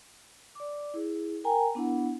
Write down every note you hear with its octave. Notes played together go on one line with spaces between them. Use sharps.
D5 D6
E4 G#4
A#4 G5 G#5 A#5
B3 D4 E4 F#5